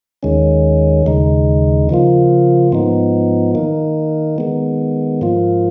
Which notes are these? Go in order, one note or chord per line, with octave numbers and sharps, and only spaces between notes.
D#2 D#3 G#3 C#4
D#2 C#3 G#3 D#4
C#3 F3 A#3 F4
G#2 F3 B3 D#4
D#3 A#3 D#4
D#3 G#3 B3
G#2 F3 A#3 F4